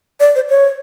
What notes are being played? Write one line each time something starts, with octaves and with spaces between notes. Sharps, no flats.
D5
C5
C#5